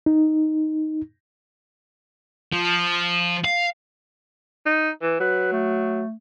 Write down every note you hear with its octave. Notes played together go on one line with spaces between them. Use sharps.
D#4
F3
F5
D#4
E3
F#3 B4
A3